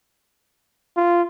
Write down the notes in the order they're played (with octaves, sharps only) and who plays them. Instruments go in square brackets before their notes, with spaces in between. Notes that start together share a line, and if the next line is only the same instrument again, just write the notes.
[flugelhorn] F4